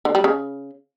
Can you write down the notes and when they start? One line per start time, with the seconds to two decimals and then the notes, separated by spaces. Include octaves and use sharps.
0.05 D3
0.15 G3
0.24 C#3